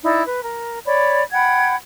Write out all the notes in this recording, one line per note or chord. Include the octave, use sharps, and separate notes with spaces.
D#4 E4 D5
B4
A#4
C#5 D5 B5
F#5 G5 B5 G#6